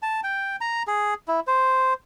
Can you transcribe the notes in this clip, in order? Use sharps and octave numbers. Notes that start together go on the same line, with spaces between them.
A5
G5
A#5
G#4
E4
C5